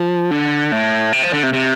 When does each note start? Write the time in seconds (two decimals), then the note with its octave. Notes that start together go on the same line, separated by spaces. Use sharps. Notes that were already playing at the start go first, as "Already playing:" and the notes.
Already playing: F3
0.31 D3
0.72 A2
1.13 C3
1.23 F3
1.33 D3
1.43 C3
1.53 C3